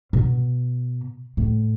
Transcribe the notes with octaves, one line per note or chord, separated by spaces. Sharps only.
B2
A2